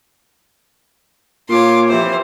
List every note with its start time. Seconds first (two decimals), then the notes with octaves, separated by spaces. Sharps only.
1.49 A#2 F4 C#5 G#5 C6 D6
1.88 C3 E3 F3 C5